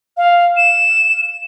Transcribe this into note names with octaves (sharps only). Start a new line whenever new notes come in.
F5
E7